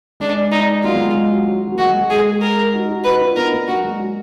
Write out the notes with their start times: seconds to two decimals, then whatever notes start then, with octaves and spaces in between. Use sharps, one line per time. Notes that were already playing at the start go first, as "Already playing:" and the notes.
0.20 G#3 D4
0.52 D#4
0.83 F#3 A#3 F4
0.94 G#3 B3
1.05 G#3
1.15 G#3
1.31 F#3
1.47 F#3
1.67 F#3
1.75 A#3
1.78 G#3 F#4
1.89 G#3
2.00 G#3
2.10 G#3 G#4
2.42 A#4
2.73 D#4 F#4
2.88 D#4 F#4
3.04 D#4 F#4 B4
3.20 D4 F4
3.36 B3 D#4 A#4
3.52 A#3 D4
3.68 F#3 A#3 F#4
3.83 G#3
3.99 F#3